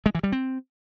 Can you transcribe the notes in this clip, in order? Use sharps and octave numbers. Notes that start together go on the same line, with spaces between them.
G#3
E3
G3
C4